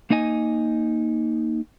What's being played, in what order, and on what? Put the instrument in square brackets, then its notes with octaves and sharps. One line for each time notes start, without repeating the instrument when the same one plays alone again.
[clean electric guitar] A#3 D#4 D#5 G#5